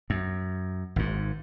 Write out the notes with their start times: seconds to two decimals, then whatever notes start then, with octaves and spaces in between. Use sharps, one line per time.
0.10 F#2
0.96 G#1 G#2